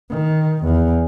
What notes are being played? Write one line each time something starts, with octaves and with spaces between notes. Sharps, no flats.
D#3
E2